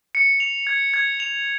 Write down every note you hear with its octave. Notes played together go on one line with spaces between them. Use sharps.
C#7
F7
G#6
G#6
F7